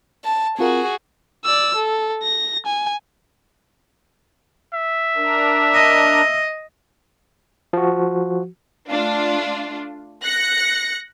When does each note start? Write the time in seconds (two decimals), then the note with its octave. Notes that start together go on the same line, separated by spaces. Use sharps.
0.25 A5
0.59 C4 F4 F#4 G#4 A#4
1.45 D5 E6
1.76 A4
2.23 A#6
2.66 G#5
4.74 E5
5.16 D4 A#4
5.74 D#5
7.73 F3 F#4
8.89 A3 D4 F4
10.23 F#6 A#6 C#7